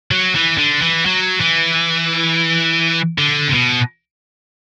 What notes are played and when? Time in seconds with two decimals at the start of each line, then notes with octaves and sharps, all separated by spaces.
0.11 F#3
0.35 E3
0.58 D3
0.82 E3
1.06 F#3
1.41 E3
3.18 D3
3.48 C3
3.54 B2